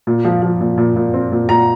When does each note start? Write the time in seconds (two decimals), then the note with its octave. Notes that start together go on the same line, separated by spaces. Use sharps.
0.07 A#2
0.25 F3
0.42 F3
0.60 A#2
0.78 A#2
0.96 A#2
1.14 C4
1.32 A#2
1.49 A#2 A#5